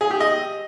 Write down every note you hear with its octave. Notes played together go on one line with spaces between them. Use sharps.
G#4
G4
D#5